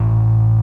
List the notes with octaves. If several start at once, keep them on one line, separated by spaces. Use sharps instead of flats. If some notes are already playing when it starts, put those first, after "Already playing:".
Already playing: A1 A2